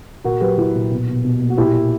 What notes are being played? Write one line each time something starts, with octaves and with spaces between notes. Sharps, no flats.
A#2 F#4 A#4
F#3 G4 B4
F#3 E4
A#2
B2
B2
B2
A#3
F#4
A#2 E4 G4
A#3